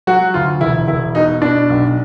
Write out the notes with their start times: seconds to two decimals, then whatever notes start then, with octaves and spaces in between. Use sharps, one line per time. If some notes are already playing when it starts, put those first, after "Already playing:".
0.07 F#3 F#4
0.34 D2 F4
0.61 E1 E4
0.88 E1 E4
1.15 B2 D#4
1.41 B2 D4
1.70 B1